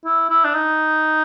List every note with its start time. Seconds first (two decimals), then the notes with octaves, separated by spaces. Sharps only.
0.05 E4
0.30 E4
0.45 D4
0.54 D#4